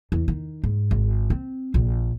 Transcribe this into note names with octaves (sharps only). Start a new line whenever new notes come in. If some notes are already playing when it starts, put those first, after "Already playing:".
E2
D#3
G#2
G#1
C4
A#1